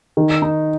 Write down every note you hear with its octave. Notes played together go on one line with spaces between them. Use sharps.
D#3
D#4